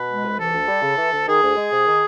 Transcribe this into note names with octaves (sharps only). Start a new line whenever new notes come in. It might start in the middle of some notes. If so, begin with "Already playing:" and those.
Already playing: B2 B4
G#3
C2
E3 A4
D2
G3
C#3
E3
D2
D#3 G#4
D2
G#3
C3
D#3